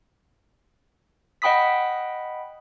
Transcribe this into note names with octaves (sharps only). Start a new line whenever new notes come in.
D#5 F#5 G5 B5 D#6 B6